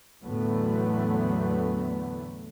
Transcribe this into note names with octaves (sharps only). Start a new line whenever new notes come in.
E2 A2 D3 F#3 A3 B3